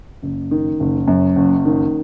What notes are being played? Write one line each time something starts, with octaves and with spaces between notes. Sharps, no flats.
F#1
D#3
F#1
F#2
F#1
D#3